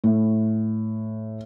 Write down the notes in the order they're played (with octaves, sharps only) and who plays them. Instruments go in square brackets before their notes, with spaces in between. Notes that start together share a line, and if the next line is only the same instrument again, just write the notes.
[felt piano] A2